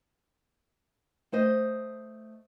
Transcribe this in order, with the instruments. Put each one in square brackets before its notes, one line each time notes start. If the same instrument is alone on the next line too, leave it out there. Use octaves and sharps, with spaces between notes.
[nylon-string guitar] A3 C5 D#5